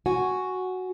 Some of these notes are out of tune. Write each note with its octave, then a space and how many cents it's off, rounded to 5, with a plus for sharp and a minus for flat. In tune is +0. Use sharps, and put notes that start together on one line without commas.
F#4 +0 G#5 +0